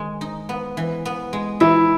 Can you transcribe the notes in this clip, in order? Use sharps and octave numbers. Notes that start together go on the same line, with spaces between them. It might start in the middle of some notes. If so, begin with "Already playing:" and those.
Already playing: D#3 G#3
D#4
B3
E3
B3
G#3
E3 E4